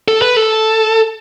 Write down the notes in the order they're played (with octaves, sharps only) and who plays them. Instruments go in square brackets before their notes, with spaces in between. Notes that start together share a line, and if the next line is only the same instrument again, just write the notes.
[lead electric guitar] A4
B4
A4